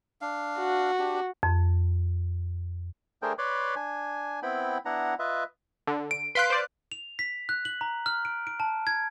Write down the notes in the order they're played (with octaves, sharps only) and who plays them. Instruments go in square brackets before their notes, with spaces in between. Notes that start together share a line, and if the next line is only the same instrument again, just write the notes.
[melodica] D4 F5
[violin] F#4
[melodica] D4 G4
[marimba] F2
[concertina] A3 D4 G#4 A#4 C5 G5
B4 C#5 D5 B5 C6 D6
D4 G#5
B3 C4 E4 G5 B5
B3 D4 E4 F#5 A#5
F4 B4 D#5 E5
[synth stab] D3
[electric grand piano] D7
[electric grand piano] B4 F5 F#6 [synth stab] C6 B6 D7
[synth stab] C5 D5
[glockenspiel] F7
B6
F#6
F#7
A#5
F6
D7
D7
A5
G#6